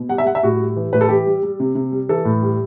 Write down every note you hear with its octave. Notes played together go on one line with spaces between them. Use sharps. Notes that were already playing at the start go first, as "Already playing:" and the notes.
Already playing: B2
G3 F#5
E5
G3 F#5
E5
A2 F#4
G3
E3
A2 B4
A4
E3 G4
G3
G3
C3
C3
G3
E3 A4
A2
G3